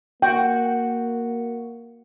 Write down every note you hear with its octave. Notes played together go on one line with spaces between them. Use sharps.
A#3 F#4 G5